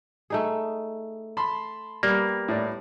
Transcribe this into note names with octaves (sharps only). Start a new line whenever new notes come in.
A3 D#4 G#4
A5 B5 C6
G3 A#3 B3
A2 D5